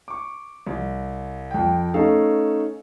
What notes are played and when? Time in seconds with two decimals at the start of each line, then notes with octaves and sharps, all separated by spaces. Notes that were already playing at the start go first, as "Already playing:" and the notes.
0.08 C#6 D6
0.67 C2
1.51 F2 G5
1.94 A3 C#4 D#4 A4 F5